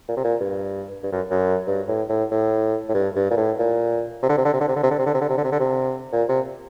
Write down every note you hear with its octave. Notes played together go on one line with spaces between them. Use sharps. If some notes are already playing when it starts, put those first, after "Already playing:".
A#2
C3
A#2
G2
G2
F#2
F#2
G2
A2
A2
A2
A2
G2
G2
A#2
A2
A#2
C3
D3
C3
D3
C3
D3
C3
D3
C3
D3
C3
D3
C3
D3
C3
D3
C3
D3
C3
A#2
C3